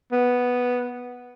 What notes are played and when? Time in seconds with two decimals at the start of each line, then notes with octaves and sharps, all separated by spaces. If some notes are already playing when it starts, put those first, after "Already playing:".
0.12 B3